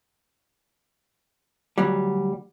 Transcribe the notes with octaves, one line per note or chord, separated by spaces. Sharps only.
D2 F#3 G3